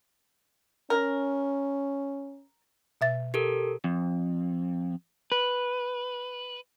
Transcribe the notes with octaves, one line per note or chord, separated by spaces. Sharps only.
C#4 A#4
B2 E5 A6
G4 A4 A#4
F2
B4